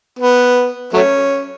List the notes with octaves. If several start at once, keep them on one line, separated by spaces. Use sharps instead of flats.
B3
F#3 A3 C#4